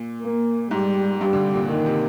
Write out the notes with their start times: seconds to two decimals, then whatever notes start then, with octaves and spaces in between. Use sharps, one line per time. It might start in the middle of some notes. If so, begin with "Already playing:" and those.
Already playing: A#2
0.22 A#3
0.71 G#2 G3
1.21 G2 G3
1.33 D3
1.43 C3
1.54 A#2
1.70 A#2 D#3
1.86 C3